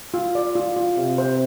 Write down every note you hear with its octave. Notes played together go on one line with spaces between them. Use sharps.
F4
D5
F4
F4
C3 F5
C5